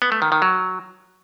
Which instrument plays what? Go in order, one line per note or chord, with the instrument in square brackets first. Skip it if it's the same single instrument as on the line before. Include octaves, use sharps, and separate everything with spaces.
[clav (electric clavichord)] B3
A3
D#3
D#3
F#3